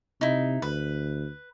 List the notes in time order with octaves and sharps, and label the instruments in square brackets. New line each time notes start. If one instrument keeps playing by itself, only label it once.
[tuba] C3 [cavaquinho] D#4 E4
[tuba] D2 [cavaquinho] B4